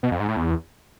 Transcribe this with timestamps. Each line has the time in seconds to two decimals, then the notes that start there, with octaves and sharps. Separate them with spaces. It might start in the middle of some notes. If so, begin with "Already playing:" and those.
0.03 B2
0.11 F2
0.20 G#2
0.28 A2
0.37 E2